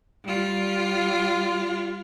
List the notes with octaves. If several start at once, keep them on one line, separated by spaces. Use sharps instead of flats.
G3 F4